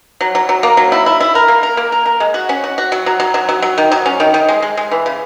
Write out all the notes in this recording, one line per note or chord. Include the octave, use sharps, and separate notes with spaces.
F#3
F#3
F#3
A#3
F#3
E4
E4
E4
A#4
A#3
A#4
A#3
A#4
A#4
G#3
F#4
C#4
F#4
F#4
F#3
F#3
F#3
F#3
F#3
F#3
D#3
F#3
C#4
D#3
D#3
G#3
G#3
G#3
E3
C#3